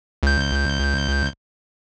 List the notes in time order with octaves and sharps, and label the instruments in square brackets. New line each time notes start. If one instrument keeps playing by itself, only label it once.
[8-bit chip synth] C#2 G6